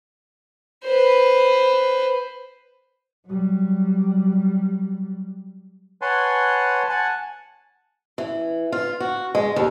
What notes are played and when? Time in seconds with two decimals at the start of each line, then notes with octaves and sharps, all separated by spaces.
0.85 B4 C5
3.27 F#3 G3
6.02 B4 C#5 F#5 G#5 A5 C6
6.89 F#5 G#5 A5
8.18 E3
8.72 F4
9.00 F#4
9.35 G#3
9.56 D#2